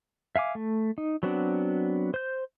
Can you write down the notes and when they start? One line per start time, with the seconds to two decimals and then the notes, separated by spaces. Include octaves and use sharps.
0.36 E5 F5 G#5 D6
0.55 A3
0.98 D#4
1.23 F#3 B3 C4 D4 F#4
2.14 C5 G6